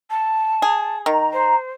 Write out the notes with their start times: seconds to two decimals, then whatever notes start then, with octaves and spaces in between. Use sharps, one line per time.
0.10 A5
0.62 G#4
1.06 D#3 A#5
1.33 C5